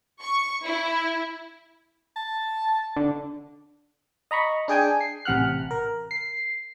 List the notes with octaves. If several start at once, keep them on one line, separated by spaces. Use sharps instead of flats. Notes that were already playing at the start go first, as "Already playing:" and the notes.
C#6
E4
A5
D3
D#5 A#5 B5 C#6
D4 G#4 G5 G#5
C7
A1 C3 F#5 F6 F#6
A#4
C7